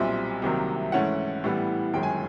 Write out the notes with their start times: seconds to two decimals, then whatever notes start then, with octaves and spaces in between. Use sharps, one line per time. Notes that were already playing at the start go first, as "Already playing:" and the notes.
Already playing: B1 A#2 G3 C4 E5
0.42 C2 C3 D#3 F#3 A#3
0.92 G#2 E3 A3 C#4 E4 F#5
1.44 A2 E3 G3 B3
1.94 G1 F#2 D#3 G#3 G5
2.03 G#5